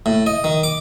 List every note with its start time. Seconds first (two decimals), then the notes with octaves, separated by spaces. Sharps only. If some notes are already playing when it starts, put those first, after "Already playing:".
0.06 A2
0.27 D#5
0.44 D#3
0.63 D6